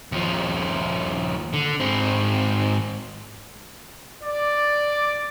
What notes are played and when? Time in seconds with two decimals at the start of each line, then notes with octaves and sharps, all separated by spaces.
0.12 D#2 F3
1.53 D3
1.80 G#2 C4
4.23 D5